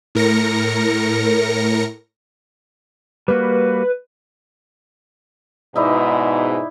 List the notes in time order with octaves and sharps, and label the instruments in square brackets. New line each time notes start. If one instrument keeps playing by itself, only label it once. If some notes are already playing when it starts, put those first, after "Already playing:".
[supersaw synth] A2 A#4 A#6 C#7
[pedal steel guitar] G3 A#3 F#4 [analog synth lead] B4
[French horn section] G#2 B2 [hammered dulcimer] D#4 E4 D5